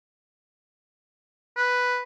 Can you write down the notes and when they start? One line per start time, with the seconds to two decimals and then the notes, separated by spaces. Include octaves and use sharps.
1.57 B4